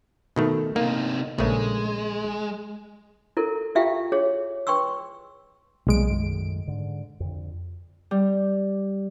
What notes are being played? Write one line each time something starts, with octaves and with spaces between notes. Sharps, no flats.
B2 D#3 A3
C3 A#3 D#4
A#1 C#3 G#3 A3
E4 A4 A#4
E4 F4 G4 E5 F5 G5
G#4 C#5
B4 G5 C6 C#6 E6
B1 C3 G3 G#3 A#3 D7
F#2 A2 D#3
G#2 D3
F2 D3
G3